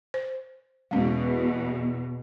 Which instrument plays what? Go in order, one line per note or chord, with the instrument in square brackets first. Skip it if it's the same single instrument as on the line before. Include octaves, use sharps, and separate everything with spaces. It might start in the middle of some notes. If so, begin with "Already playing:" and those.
[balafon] C5
[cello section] E2 B2 [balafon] G#3 C#4